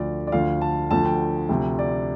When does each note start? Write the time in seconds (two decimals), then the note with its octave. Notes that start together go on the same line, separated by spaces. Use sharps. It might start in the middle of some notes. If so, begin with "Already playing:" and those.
Already playing: D2 D3 F3 D5
0.27 D5
0.32 D2 D3 F3 F5
0.61 A5
0.91 D2 D3 F3 A5
1.06 G5
1.49 D2 C3 F3
1.79 D5